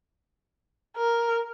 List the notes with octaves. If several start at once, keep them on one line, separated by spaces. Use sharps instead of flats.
A#4